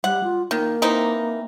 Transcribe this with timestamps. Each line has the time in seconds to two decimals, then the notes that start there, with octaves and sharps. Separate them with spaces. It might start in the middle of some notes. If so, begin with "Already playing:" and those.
0.04 G3 F#5
0.24 F4
0.51 D#3 A#3
0.82 E3 C4 D#4